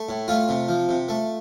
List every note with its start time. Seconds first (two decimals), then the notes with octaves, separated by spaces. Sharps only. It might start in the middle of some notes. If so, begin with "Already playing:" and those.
Already playing: A3
0.09 A2
0.28 A3 F4
0.49 C3
0.69 F3
0.89 C3
1.09 A3